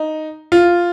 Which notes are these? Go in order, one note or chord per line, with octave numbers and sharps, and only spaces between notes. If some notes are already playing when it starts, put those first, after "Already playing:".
Already playing: D#4
F4